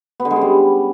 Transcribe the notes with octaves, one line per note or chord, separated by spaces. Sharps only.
B3
D3
G#3
C#4
G3